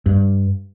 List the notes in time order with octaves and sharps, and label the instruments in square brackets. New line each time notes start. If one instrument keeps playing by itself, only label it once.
[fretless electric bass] G2